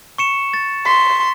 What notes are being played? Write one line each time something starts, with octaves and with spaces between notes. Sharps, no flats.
C#6 C#7 E7
A6
C6 B6